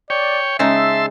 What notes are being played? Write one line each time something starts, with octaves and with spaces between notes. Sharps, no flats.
C#5 D5 G5
C#3 G#3 D#4 E5 A5 C6 E6